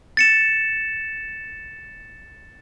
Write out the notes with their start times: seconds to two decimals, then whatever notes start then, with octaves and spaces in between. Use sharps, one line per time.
0.17 A6 C#7 E7